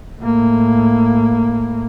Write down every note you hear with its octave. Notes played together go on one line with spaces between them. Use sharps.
A2 A#3